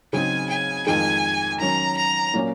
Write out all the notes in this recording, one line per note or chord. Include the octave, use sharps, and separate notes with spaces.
C#3 F#3 C4 D#4 G#5
G#5
F2 D#3 G#3 D#4 G#5
D#3 F#3 C#4 A#5
A#5
A#2 F#3 A#3 C#4